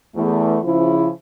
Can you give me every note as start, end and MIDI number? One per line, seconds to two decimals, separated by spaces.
0.15 0.58 40
0.15 0.58 57
0.64 1.09 49
0.64 1.09 53
0.64 1.09 64